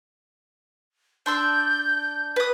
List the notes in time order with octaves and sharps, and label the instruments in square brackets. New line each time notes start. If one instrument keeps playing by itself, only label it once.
[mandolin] D4 C6 E6 [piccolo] G6
[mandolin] B4 D#6